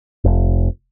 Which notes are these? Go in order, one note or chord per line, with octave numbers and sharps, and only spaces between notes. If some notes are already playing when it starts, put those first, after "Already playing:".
F1